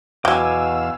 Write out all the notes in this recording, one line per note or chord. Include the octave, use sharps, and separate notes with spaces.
E2 B2 F#3 F5 G5 G#5 D6 E6